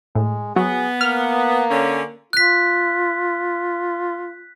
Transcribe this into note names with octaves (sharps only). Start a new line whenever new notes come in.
A2 G#3
F#3 B3 G#4
A#3 F6
D3 C#4
F4 F#6 B6